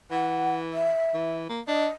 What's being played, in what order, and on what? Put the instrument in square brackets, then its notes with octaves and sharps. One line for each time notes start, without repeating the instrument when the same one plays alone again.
[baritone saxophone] E3 [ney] F#5
[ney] E5
[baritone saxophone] E3
A#3
[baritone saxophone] D4 [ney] D#5